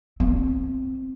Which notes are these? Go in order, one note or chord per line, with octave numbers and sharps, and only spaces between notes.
C4